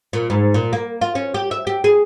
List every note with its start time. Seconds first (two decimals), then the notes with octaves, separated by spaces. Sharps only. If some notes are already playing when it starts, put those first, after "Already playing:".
0.13 A#2
0.30 G#2
0.54 A#2
0.73 A#3
1.01 F4
1.15 C#4
1.34 G4
1.51 E5
1.67 G4
1.84 G#4